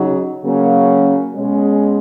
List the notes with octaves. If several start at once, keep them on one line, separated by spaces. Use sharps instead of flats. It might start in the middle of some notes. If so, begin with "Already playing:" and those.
Already playing: C#3 F#3 D#4
C#3 F#3 A#3 C#4
B2 G#3 C#4 G#4